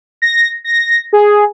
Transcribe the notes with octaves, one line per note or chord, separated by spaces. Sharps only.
A#6
A#6
G#4